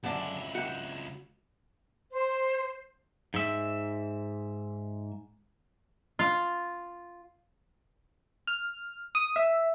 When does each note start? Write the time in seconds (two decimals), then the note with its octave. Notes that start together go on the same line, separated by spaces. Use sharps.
0.04 C#2 F#2 D3 D4 E4
0.55 F#4 G5
2.11 C5
3.34 G#2 E5
6.19 F4
8.47 F6
9.15 D#6
9.36 E5